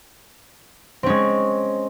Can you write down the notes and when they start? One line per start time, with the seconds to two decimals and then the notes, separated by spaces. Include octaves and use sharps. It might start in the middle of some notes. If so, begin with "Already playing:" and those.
1.03 C4
1.06 C#4
1.09 G#3